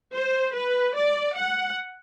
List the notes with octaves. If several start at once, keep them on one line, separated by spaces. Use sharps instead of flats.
C5
B4
D5
F#5